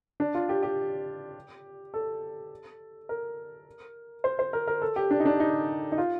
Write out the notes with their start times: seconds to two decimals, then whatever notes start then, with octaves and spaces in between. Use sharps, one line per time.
0.20 D4
0.34 F4
0.49 G4
0.63 G4
1.94 A4
3.09 A#4
4.24 C5
4.39 C5
4.53 A#4
4.67 A#4
4.82 A4
4.96 G4
5.11 D4
5.20 D#4
5.25 D4
5.40 D#4
5.92 D#4
5.98 F4